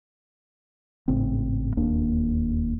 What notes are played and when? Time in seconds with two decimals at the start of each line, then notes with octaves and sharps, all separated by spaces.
1.08 G#1 A2 C#3 C4
1.77 E1 D#2 A#3 D4